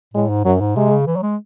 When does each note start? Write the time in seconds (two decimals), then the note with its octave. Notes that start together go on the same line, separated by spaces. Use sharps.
0.14 A2 G#3
0.29 G#2
0.45 F#2 F#3
0.60 G#2
0.76 C3 G#3
0.91 C#3
1.07 E3
1.16 F#3
1.23 G#3